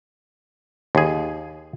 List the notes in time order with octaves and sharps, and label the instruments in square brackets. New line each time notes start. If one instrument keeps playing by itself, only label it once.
[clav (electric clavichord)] D#2 G#4